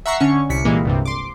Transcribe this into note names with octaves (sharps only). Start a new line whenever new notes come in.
E5 F#5 A#5 C#6 E6 C7
D3 C#4 C#6
C2 B6 C#7
A#2 E3 G3 G#3 A#3
C2 G2 C3
C6 D6